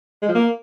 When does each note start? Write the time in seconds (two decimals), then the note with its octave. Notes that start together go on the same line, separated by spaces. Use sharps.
0.22 G#3
0.28 F3
0.35 A#3